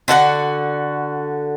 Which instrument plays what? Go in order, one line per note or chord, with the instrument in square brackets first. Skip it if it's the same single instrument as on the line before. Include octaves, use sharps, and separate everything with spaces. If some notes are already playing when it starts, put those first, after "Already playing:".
[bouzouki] D3 F#4 A4 F#5